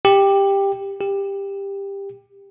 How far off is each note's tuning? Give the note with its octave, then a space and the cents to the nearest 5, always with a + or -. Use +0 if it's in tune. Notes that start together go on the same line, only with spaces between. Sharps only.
G4 +10
G4 +15